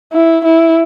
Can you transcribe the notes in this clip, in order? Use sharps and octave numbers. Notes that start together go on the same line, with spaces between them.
E4
E4